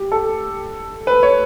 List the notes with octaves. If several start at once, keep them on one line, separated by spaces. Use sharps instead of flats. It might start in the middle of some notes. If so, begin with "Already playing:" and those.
Already playing: G4
A4
B4
C#5